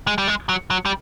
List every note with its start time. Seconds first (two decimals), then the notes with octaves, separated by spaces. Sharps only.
0.07 G#3
0.18 G3
0.28 G#3
0.49 F#3
0.70 F#3
0.85 G3